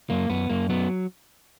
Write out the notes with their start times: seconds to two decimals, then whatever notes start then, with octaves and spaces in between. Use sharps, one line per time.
0.10 F#2 A#3
0.29 F#2 B3
0.50 F#2 A#3
0.69 F#3 B3